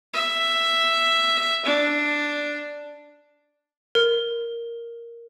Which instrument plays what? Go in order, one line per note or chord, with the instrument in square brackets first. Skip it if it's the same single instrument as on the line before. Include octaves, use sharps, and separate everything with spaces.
[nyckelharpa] E5
D4
[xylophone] A#4